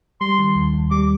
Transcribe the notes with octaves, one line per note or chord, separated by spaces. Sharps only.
G3 C6
D#3
D#2
D#2
G3 D6